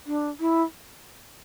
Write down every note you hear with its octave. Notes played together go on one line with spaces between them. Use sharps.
D4
E4